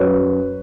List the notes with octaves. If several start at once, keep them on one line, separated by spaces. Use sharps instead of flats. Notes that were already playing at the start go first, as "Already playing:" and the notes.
Already playing: F#2 B4 C#5